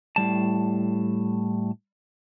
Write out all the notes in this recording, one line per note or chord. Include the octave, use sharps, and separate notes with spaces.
A2 G3 A5